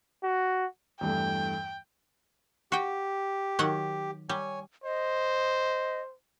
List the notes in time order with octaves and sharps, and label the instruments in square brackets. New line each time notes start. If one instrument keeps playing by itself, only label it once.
[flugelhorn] F#4
[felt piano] E2 G2 A3 [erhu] G5
[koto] F#4 G5 [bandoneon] G4
[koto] D#3 F#3 F#5
[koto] G3 [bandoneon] C#5 G#5
[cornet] C5 [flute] D#5